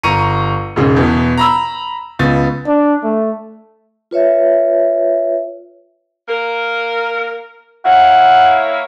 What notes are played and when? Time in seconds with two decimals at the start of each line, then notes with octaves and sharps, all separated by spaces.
0.03 G1 A#5 C#6 C#7 D#7
0.76 E1 G#2 C#3
0.96 E2 B2
1.37 A#5 B5 E6
2.19 C#2 B3 A6
2.67 D4
3.04 A3
4.11 F4 B4 C#5 E5
6.28 A#3 A#4
7.85 A#3 E4 C#5 F#5